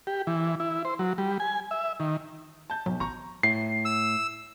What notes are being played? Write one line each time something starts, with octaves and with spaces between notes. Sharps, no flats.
G4
E3
E4
C5
F#3
G3
G#5
E5
D#3
A5 G6
B1 F#3
A1 A#5 C#6
A2 C7
E6